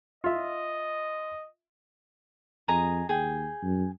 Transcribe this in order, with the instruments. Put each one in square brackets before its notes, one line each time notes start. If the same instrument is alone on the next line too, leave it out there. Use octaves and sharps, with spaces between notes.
[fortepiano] F4 E5 [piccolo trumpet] D#5
[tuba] F2 [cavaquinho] G#4 D#5 A#5
[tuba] D#2 [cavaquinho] G#4 G5
[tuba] F#2